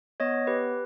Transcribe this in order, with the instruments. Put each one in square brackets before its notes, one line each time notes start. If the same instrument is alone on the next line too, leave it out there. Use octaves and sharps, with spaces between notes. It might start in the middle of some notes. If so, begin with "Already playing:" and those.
[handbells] B3 C#5 D#5
G4 B4